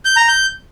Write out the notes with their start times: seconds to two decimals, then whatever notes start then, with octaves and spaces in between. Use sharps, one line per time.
0.05 G6
0.17 A#5
0.28 G6